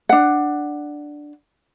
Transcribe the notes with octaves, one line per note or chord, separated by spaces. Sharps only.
D4 F#5